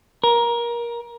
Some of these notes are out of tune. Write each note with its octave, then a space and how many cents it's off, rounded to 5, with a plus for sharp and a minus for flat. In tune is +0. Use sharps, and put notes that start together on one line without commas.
A#4 +20